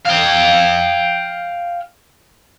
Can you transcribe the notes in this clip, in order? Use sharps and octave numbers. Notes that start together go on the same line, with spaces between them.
F5 G5